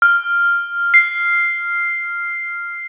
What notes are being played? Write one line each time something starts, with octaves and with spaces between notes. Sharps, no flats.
F6
C7